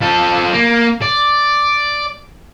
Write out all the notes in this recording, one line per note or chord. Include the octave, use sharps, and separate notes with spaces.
F3 A4
A#3
D5